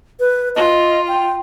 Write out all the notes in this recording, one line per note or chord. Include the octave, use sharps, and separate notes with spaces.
B4
F4 D#5
G5